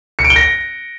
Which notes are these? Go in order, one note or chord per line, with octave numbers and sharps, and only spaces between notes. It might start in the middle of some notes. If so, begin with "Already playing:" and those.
C#7
D7
G7
A#6